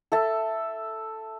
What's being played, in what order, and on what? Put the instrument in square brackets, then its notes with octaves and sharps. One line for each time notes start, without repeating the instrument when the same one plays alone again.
[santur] A4 E5 A5